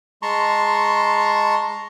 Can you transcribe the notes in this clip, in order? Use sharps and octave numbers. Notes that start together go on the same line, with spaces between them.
G#3 A5 A#5 C6 C#6